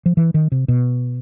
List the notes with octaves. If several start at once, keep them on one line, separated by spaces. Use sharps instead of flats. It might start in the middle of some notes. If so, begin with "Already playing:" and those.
F3
E3
D#3
C3
B2